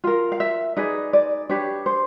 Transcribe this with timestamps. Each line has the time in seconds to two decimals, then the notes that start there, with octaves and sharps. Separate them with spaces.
0.04 F4 A#4 F5
0.32 F5
0.40 E5
0.77 D#4 G#4 B4 D5
1.13 D5
1.49 D4 G4 B4 C#5
1.86 C5